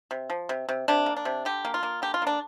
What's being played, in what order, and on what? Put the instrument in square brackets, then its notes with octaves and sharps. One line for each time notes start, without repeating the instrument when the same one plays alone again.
[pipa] C3
F3
C3
C3
C3 D4
A#3
D4
C3
D3 G4
A#3
F4
A#3
D3 G4
F4
A#3 D4